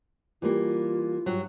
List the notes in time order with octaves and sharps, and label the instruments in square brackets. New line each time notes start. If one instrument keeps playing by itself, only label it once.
[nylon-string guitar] E3 G3 A#3 [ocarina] F4
[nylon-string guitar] G2 F#3